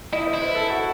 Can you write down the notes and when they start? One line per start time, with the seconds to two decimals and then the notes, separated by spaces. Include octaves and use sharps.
0.13 E4 D#5
0.27 C5
0.34 E4
0.41 B4
0.55 A4
0.70 F#4